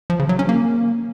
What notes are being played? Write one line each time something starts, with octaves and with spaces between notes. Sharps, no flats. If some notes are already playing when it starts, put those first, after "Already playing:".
F3
C#3
F#3
C#4
A#3